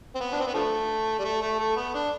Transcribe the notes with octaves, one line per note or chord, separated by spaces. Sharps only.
C4
B3
D4
C4
B3
D3 F3 A3
G3
A3
A3
A3
B3
D4